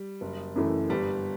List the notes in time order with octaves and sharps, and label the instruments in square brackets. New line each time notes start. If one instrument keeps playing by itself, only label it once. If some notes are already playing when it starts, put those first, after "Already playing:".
Already playing: [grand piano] G3
[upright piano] F#1
F#2 E3 A3
[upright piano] G1 [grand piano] G3